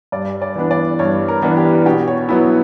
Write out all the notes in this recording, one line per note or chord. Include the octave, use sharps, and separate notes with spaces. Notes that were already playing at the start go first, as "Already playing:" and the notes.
G2 D5
D5
E3 B3 D4
D5
G2 C#5
A#4
E3 B3 D4
G4
B2 G4
C#5
F#3 B3 E4